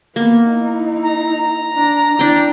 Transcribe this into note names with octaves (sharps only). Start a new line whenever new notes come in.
A#3 B3
D#4 E4
A#5
A#5
D4
D4 E4 D5 G5